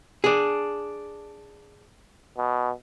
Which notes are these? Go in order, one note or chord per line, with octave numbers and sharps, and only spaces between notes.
D4 G#4
B2